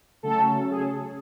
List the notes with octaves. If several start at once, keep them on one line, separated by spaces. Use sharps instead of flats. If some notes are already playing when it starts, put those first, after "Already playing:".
C#3 F#3 A3 C#4 A4
G#4